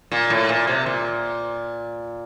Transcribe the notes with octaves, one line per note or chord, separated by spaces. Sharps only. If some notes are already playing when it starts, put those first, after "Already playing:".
A#2
A2
A#2
C3
A#2